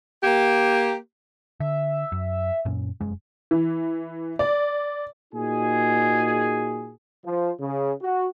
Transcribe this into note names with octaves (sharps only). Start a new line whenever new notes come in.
A#3 G4
D3 E5
F#2
F#2 A#2 C#4
F1 F#2 G#3
E3
D5
A#2 D#4 F#4 G#4
F3
C#3
F#4